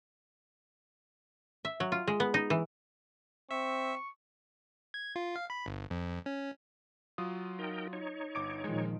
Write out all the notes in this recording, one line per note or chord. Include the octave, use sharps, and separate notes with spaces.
E5
F#3
F4
G#3
B3
D#4
E3
C4 E5 C#6
G#6
F4
F5
B5
G1
F2
C#4
F#3 F4 D#6
D#4 A#4 G5
D#4 C#5
G1 D6 D7
A#2 D#3 F3 G#3